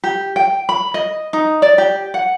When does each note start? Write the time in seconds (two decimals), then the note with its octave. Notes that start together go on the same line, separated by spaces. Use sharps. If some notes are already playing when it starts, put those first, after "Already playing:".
0.04 G4
0.36 G5
0.69 B5
0.94 D#5
1.33 D#4
1.62 D5
1.78 G4
2.14 F#5